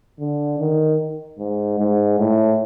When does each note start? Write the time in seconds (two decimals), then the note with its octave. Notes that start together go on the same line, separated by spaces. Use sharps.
0.20 D3
0.59 D#3
1.39 G#2
1.79 G#2
2.19 A2